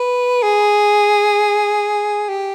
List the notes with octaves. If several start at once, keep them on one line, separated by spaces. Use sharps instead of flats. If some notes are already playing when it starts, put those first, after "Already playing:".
Already playing: B4
G#4
G4